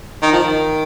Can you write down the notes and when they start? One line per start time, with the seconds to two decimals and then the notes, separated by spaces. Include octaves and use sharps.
0.22 D#3
0.32 F3
0.43 D#3